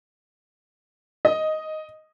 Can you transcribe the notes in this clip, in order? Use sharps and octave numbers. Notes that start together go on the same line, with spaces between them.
D#5